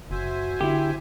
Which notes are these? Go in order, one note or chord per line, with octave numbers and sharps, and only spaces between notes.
F#1 F#4 C5 E5 G#5
D3 E4 G4